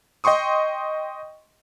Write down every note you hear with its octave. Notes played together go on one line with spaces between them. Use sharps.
D#5 G5 C6 C#6 D#6